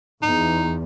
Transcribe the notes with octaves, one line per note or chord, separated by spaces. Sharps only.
E2 D#4